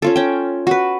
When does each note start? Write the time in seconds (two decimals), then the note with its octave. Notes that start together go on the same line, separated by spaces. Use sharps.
0.02 C#4 F4 A4
0.16 C#4 G5
0.67 F#4 B4